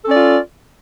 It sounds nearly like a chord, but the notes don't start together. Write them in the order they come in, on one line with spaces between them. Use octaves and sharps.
A4 C#4 D5 F4